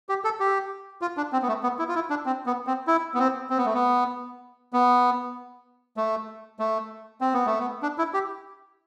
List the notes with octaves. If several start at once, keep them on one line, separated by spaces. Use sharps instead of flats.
G4
A4
G4
F4
D4
C4
B3
A3
B3
E4
F4
E4
D4
C4
B3
C4
E4
B3
C4
C4
B3
A3
B3
B3
A3
A3
C4
B3
A3
B3
D4
E4
G4